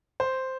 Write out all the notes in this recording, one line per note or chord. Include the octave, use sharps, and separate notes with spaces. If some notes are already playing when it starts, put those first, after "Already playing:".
C5